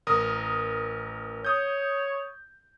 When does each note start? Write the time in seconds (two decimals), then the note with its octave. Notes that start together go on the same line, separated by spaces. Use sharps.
0.07 A1 A#4 D#6
1.45 C#5 D#6 G6